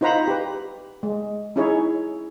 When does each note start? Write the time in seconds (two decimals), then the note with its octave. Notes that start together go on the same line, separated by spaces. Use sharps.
0.01 D#4 F4 C5 F#5 A#5 B5
0.28 G4 B4
1.03 G#3
1.56 C#4 D#4 E4 G#4 C#5